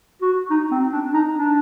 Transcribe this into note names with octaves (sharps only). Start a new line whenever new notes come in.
F#4
D#4
C4
D4
D#4
D4